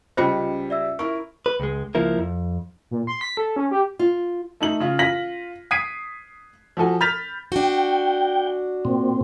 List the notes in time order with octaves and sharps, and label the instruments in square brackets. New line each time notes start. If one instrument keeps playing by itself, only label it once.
[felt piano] C#2 G3 C#7 [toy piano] C#4 F4 C5 [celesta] D#5
[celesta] D5 E5 E6
[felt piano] E4 A#4 [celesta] C#6
[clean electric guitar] B4
C#2 G#3
C#2 F3 A#3 E4 A#4
F2
[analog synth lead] A#2
C6
B6
A4
C#4
G4
[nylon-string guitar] F4
[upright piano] A3 D#4 F#7
C#3 F4
F4 A#6 B6 F#7
D#6 G#6 B6 C7 D7 D#7
F3 F#4 A4 G#5
B5 F6 G6 A6 B6 F7
[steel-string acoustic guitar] D4 F#4 [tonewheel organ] G5
[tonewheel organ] A#2 C4